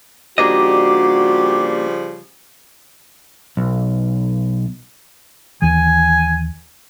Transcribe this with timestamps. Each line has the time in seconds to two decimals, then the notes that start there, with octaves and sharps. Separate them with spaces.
0.38 C#3 F3 G3 A#3 D4 F#4 G4 D#5
3.57 B1
5.62 D#2 E3 G#5